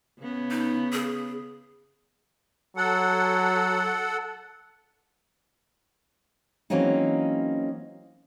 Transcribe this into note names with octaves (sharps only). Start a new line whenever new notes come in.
C#3 B3
D#4
G#4
F#3 A4 F#5
E3 F#3 A#3 C4 C#4 D#4